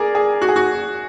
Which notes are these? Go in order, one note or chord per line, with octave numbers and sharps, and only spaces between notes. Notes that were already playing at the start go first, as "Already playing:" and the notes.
Already playing: G#4 A#4 D5
G#4
F#4
G#4
F#4